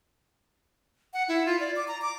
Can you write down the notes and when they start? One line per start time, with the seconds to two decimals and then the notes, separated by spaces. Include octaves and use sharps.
1.13 F#5
1.28 E4
1.46 F4
1.60 D5
1.76 D6
1.88 A#5
2.02 D6